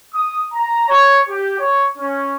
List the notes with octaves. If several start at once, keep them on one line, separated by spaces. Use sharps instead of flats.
D#6
A#5
C#5
G4
C#5
C#4